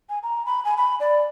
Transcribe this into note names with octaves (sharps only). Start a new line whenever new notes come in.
G#5
A#5
B5
G#5
B5
D5